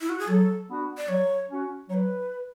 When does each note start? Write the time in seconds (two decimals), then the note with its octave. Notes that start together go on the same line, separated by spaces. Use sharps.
0.01 E4
0.09 F#4
0.19 G#4
0.28 F#3 A4
0.69 B3 D4 F#4
0.97 D5
1.08 F#3 C#5
1.49 C#4 F#4
1.88 F#3 C#5
1.94 B4